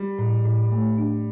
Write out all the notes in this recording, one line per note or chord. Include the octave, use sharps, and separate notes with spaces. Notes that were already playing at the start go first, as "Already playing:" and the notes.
Already playing: G3
A2
A2
A3
D4